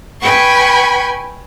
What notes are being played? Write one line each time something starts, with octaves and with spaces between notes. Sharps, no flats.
B4 G5 G#5 B5 C#6